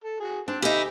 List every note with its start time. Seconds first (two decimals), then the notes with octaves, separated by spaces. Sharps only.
0.04 A4
0.20 F#4 G#4
0.48 C4 D4
0.62 D2 D#4 E4 G4 F5 G#5
0.77 D#5